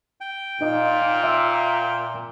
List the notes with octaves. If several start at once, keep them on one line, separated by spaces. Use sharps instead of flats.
G5
A#2 D#4 F4 D#5
E5 E6